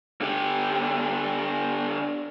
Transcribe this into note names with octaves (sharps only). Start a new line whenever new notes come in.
D3 G4